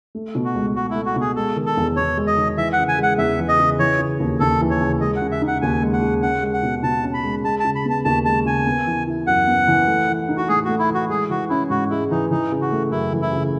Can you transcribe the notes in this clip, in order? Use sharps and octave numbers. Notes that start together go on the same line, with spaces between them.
A3
B2
F#4
C#2
C#2 F#4
A3 E4
F#4
B2
G#4
G#3 A4
D#3
A4
E2
E2 C#5
G#3
D#5
D#3
E3 E5
F#5
C#3
G#5
G#3 F#5
E2 E5
E3
D#5
C#3
E3 C#5
C#3
D#2
D#2 A4
E3
C#5
C#3
G#3 D#5
F#5
C#3
E5
D#4
F#5
D#2 G#5
G#3
F#5
C#3
C#4 F#5
G#3
F#5
B2
B2 A5
C#4
B5
G#3
G#3 A5
C#3 A5
B5
B3 A5
D#2 A5
G#3 A5
C#3 G#5
B3
E3
E4
F#2 F#5
B3
E3
A3
E3
D#4
F#4
A2 G#4
A3 F#4
E4
E3
F#4
G#3 G#4
E3 F#4
C#4 E4
G#2 F#4
G#3 E4
E3 D#4
E3 D#4
C#3
F#4
A3
F#2 E4
E3
E4
C#3